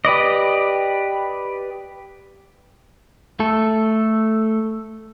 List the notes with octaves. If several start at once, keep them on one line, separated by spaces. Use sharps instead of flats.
G4 B4 D5 D#5
A3 A4